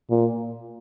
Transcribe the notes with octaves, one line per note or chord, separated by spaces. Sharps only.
A#2